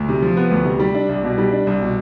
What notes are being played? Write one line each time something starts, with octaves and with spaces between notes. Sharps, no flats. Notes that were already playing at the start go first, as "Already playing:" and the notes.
Already playing: D2
C3
F3
B3
D2
C3
G3
D4
C2
B2
G3
D4
C2
B2